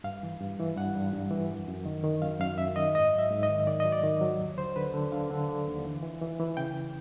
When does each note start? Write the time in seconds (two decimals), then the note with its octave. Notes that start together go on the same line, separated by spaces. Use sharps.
0.04 G2 F5
0.23 E3
0.41 G2
0.59 E3
0.77 G2 F#5
0.96 G2
1.13 G2
1.31 E3
1.50 F#2
1.68 F#2
1.86 D#3
2.04 D#3
2.22 F#2 F5
2.40 F#2 F5
2.58 F#2 E5
2.76 D#3 D#5
2.94 G#2 D#5
3.13 F#3
3.19 E5
3.31 G#2
3.43 D#5
3.49 D#3
3.67 D#3 D5
3.80 F#3 D#5
3.92 D5
4.03 D#3
4.21 F#3
4.40 D#2
4.58 D3 C5
4.76 D3 B4
4.94 D3
5.12 D3 F5
5.31 D3
5.49 D3
5.67 D#2
5.85 E3
6.03 E3
6.21 E3
6.40 E3
6.57 C#3 G5